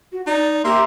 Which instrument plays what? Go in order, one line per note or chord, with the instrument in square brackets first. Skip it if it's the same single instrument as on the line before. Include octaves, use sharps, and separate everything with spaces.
[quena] F#4
[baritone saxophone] D#4 [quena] D5
[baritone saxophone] A#3 [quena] G4 [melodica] E5 A#5 C6